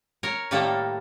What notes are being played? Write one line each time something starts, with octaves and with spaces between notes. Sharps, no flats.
A#4 C#5
A2 D#3 G3 A#3 A4 A#5